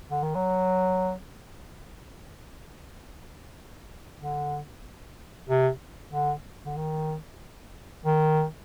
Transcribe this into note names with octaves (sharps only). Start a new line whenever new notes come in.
D3
D#3
F#3
D3
C3
D3
D3
D#3
D#3